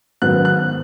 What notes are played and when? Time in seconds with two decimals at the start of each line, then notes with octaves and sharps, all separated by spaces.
0.22 G#2 D#3 F#3 B3 F#6
0.45 F#6